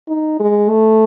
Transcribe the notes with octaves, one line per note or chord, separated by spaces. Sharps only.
D#4
G#3
A3